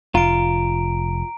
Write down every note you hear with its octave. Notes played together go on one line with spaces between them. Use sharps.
F1 F4 A#5 D7